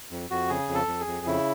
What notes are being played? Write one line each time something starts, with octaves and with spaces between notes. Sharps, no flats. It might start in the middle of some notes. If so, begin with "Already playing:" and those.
F2
F2 F#4
C#3 G#4
F2
A4
F2
G#4
F2
C#3 E4